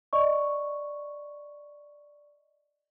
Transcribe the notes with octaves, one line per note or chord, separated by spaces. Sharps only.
D5 D#5 C#6